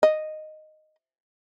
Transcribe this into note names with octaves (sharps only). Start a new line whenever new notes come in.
D#5